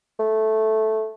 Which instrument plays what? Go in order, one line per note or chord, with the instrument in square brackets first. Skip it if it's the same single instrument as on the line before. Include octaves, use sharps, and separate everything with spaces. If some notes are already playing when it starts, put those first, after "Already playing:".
[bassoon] A3